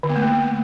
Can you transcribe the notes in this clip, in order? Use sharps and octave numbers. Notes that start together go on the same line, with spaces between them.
D3
B3
A3
A#3